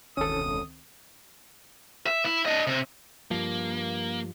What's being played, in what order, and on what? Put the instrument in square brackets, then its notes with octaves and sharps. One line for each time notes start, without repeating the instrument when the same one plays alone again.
[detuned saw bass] E1 [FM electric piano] C#2 D#3 C4 [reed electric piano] C#4 A4 [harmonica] D#6
[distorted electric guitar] E5
E4
D4 D#5
C3
[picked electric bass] G2 F3 [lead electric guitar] A#3